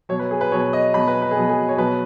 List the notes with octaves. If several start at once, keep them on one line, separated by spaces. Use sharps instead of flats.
B2 F#3 C#5
B4
G#4
B4
B2 F#3 C#5
D#5
B2 F#3 B5
B4
B4
G#4
B2 F#3
G#4
C#5
B2 F#3 B4